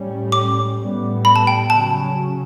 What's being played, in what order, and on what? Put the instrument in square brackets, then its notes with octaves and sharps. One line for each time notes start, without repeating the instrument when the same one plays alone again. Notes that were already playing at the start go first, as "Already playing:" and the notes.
Already playing: [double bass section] A2 G3 C#4
[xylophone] D6
[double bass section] A2 G3 B3
[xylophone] B5
A5
G5
[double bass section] C#3 F#3 C#4 [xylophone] A5